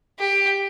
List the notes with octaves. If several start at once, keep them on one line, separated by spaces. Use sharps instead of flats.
G4